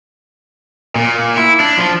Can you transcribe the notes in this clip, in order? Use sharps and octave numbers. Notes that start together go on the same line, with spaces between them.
A#2
E4
D4
F3